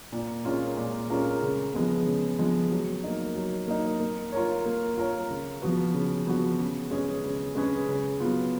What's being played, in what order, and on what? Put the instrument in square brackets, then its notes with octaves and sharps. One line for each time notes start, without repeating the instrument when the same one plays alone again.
[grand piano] A#2
G#3 C#4 F4 A#4
A#2
G#3 C#4 F4 A#4
C#3
F3 G#3 B3
C#3
F3 G#3 B3
F#3
A#3 D#4
F#3
A#3 D#4
A#3
F4 A#4 C#5
A#3
F4 A#4 C#5
C#3
F3 B3 F#4 B4
C#3
F3 B3 F#4 B4
C#3
G#3 C#4 G#4 B4
C#3
G#3 C#4 G#4 B4
C#3
F#3 B3 F4